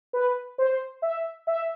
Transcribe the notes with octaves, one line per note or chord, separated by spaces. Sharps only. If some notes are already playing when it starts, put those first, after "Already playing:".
B4
C5
E5
E5